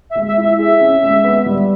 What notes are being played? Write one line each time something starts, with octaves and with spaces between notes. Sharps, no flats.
E5
G#3
E5
E4
E5
G#4 E5
C#4
G#3
B3
G3